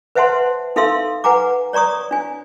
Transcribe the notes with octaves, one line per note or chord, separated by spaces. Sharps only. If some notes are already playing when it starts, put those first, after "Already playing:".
B4 C5 E5 F#5 A5 C6
D#4 A4 E5 F5 C6 E6
B4 F#5 G#5 A#5 D6
C#5 D5 A#5 C#6 D#6
D4 G#5